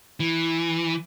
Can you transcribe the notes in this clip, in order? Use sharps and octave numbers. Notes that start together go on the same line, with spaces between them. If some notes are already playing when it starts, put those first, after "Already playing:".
E3